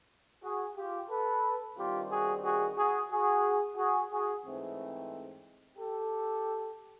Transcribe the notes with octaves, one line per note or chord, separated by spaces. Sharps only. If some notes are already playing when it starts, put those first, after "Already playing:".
F#4 G#4
F4 G4
A4 B4
G2 D#3 G3 C4 F4 G4
F#4 G#4
F#4 G#4
F#4 G#4
F#4 G#4
F#4 G#4
F#4 G#4
G#2 E3 A3 C4
G4 A4